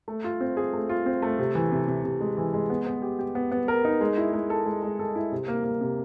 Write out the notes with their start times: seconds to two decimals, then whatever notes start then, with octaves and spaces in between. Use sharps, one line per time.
0.08 A3
0.24 F4
0.40 C4
0.57 G#4
0.73 A3
0.89 F4
1.06 C4
1.22 A3
1.39 C3
1.55 E3
1.72 C3
1.88 C3
2.04 C3
2.21 G#3
2.37 E3
2.54 G#3
2.70 B3
2.86 B3
3.02 G4
3.19 G4
3.35 B3
3.52 B3
3.68 A#4
3.85 D#4
4.01 G#3
4.17 E4
4.33 G#3
4.50 A4
4.66 G#3
4.82 G#3
4.99 A4
5.16 E4
5.32 C3
5.48 A#3
5.64 A#3
5.81 C3